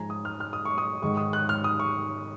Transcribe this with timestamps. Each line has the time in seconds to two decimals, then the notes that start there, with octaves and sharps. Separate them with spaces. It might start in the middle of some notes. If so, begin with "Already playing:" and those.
Already playing: G#2 F3 G#3 G#5 A#5
0.10 D#6
0.25 F6
0.40 F6
0.53 D#6
0.65 C#6
0.78 D#6
1.02 G#2 D#3 G#3 C#6
1.17 D#6
1.33 F#6
1.49 F6
1.64 D#6
1.80 C#6